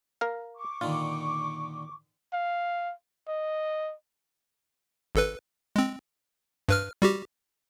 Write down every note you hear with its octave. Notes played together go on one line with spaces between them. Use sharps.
A#4 F5
C#6 D6
A#2 D3 D#3 F4
F5
D#5
G#1 A4 B4
G#3 C4
G2 B4 F6
G3 F#4 G4